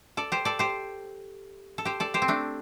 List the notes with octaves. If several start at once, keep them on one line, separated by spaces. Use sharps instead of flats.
A4 D5
G4 C5
A4 D5
G4 C5
A4
G4 C5
A4 D5
G4 C5
C4
A3 D4